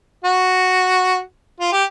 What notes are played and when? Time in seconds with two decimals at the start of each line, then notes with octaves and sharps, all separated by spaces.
0.25 F#4
1.60 F4
1.72 G4